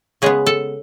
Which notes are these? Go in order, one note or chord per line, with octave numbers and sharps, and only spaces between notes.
C#3 G#3 B3 G#4
A4